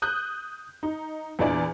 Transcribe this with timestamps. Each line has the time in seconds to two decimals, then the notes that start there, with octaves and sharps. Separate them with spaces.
0.02 D#6 F#6 G6
0.83 D#4
1.39 E2 A#2 E3 D4 D5